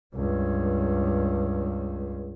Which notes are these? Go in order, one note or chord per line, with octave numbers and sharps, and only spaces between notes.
C#2 G2